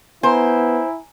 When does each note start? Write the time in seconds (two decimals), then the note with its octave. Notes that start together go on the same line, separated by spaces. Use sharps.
0.23 B3 E4 C5 G#5 A#5